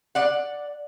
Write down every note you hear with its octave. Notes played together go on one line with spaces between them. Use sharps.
D5 F#5